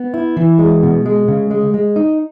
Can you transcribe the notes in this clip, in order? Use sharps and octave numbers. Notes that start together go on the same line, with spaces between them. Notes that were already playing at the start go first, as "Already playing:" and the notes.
Already playing: B3
E4
E3
G#3
B2
G#3
C#3
G#3
G#3
D#4